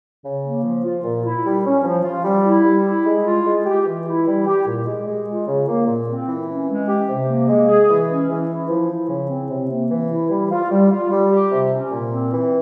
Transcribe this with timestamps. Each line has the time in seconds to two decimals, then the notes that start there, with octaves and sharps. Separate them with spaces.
0.24 C#3
0.43 A#3
0.64 F3
0.84 F4
1.04 A#2
1.25 E4
1.45 G3
1.64 C#4
1.84 F3
2.04 F4
2.24 G3
2.45 E4
2.64 G3
2.85 E4
3.06 G#3
3.25 F4
3.46 G#3
3.66 G4
3.86 E3
4.06 E4
4.26 G3
4.46 G4
4.67 A#2
4.87 G#3
5.07 G#3
5.27 F4
5.47 C#3
5.67 A#3
5.87 A#2
6.07 C4
6.28 E3
6.47 C#4
6.67 G#3
6.88 G4
7.08 C3
7.28 A#3
7.48 G#3
7.68 G#4
7.89 E3
8.09 C#4
8.29 E3
8.48 E4
8.70 F3
8.90 E4
9.09 C#3
9.29 C4
9.49 C3
9.70 A#3
9.89 E3
10.11 E4
10.30 G3
10.51 F4
10.70 G3
10.91 F4
11.10 G3
11.31 G4
11.51 C3
11.71 C#4
11.91 A#2
12.12 C4
12.32 E3